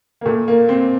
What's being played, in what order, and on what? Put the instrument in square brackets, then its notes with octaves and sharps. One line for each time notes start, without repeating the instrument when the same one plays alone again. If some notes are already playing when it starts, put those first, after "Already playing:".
[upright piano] A#3
A#2 A3
A#3
C4